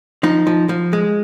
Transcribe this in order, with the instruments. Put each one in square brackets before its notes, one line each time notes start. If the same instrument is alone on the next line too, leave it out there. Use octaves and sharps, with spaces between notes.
[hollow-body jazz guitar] F3 D#4
F3
F3
G#3